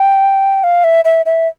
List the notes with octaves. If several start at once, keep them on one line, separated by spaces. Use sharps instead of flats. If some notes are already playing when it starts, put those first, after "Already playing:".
Already playing: G5
F5
E5
E5
E5